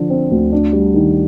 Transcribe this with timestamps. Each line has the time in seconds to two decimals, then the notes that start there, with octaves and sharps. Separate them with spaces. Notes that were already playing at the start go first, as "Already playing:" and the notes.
Already playing: D3 F3
0.10 C4
0.31 D2
0.52 D4
0.73 G3
0.94 D#3